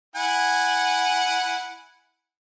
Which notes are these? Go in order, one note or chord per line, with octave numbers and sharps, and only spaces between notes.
E4 F#5 G#5